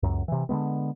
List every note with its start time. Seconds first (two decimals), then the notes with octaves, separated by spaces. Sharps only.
0.03 C#2 F#2
0.28 C3 E3
0.49 D3 D#3 G#3 B3